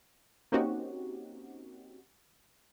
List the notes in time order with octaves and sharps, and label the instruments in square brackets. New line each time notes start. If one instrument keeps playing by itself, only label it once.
[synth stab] A#3 C4 C#4 D#4 F#4 G4